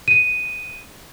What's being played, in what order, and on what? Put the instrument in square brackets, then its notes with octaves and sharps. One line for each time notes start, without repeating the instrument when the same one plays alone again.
[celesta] D#7